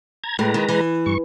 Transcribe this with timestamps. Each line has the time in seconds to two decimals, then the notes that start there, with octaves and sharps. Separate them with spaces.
0.24 A#5 G#6
0.39 A2 G#3 B4 A#5
0.54 D#3
0.68 E3
1.06 G2 C#6